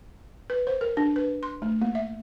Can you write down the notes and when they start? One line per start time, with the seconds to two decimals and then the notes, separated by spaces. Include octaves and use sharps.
0.50 B4
0.67 C5
0.81 A#4
0.97 D4
1.16 B4
1.43 C6
1.62 A3
1.82 A#3
1.95 E5